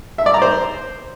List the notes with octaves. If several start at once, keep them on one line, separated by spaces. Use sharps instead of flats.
E5
D5
A#5
C5